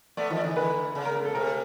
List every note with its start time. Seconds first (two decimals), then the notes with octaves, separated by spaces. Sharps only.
0.17 A3 B3 D5
0.30 D#3 F3
0.37 D5
0.43 D3 E3
0.51 D#3
0.56 D3 B4
0.95 C#3
1.05 A#4
1.15 A#4
1.25 A4
1.35 C3 A#4